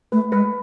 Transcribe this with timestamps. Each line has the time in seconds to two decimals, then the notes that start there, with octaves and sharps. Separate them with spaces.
0.12 A3 B4
0.32 G#3 B4